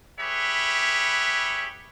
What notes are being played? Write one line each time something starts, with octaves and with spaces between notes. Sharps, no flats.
G4 G#4 B4 C#5 E5 B5